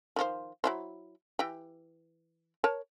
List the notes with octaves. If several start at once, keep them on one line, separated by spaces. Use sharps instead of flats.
D#3 F3 C5
F#3 E4 C5
E3 G4
A#4 C#5 A5